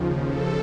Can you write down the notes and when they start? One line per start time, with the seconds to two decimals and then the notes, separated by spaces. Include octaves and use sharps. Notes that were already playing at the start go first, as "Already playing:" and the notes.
Already playing: D#2 C#3 F3
0.28 A4